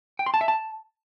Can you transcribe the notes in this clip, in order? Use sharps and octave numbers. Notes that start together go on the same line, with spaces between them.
G5
C6
A5
E5
A5